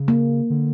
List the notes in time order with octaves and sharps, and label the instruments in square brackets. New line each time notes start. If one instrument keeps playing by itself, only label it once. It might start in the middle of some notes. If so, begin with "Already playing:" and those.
Already playing: [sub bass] C#3
[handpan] A#3
[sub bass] D3